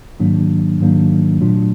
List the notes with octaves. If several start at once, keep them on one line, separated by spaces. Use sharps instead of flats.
G#2 D#3 F#3 A#3 D4
G#2 D#3 F#3 A#3 D4
A#2 F#3 A3 D4 F4